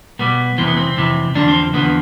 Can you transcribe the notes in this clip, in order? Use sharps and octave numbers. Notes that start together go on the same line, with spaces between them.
B2 G3 B3
F2 C3 E3 C4
B3
C4
F2 C3 E3
E2 D3 F3 D4
C4
E2 D3 F3 B3